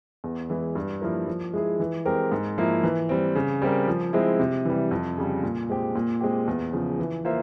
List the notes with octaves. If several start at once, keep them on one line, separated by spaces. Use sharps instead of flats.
E2
E3 G#3 E4
G2
F3 A#3 E4 A#4
F3
G#3 E4 G#4
E3
G#3 C4 G4 A#4
G#2
F3 A#3 E4
E3
G3 C4
C#3
G3 C4 G4 A#4
F3
G#3 C4 E4
C3
E3 G3
F2
C#3 G3
A#2
G#3 C4 G4
A#2
G#3 C4 G4
E2
C#3 F3
E3
A#3 F4 C5 E5